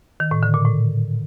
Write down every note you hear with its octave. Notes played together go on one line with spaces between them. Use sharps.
D#3
A2
D3
A#2
A2